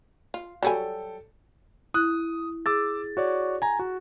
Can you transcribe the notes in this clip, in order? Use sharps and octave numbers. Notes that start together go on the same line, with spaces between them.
F4
F#3 G3 A4 G5 G#5
E4 D#6 F#6
G#4 D6 E6 A6
F#4 C#5 D5
G#5 A#5
F#4